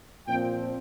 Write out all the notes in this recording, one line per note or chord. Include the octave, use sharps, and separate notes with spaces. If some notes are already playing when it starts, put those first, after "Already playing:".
A#2 F3 C4 G5